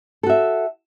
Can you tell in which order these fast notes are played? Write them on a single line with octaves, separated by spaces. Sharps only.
A4 F#4 E5